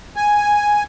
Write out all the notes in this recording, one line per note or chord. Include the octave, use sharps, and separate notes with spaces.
G#5